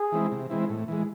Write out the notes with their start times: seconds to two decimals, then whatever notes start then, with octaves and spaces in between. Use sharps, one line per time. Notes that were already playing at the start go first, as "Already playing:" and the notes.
Already playing: G#4
0.12 E3 G#3 C4 E4
0.32 C3
0.50 E3 G#3 C4 E4
0.69 A2
0.88 E3 G#3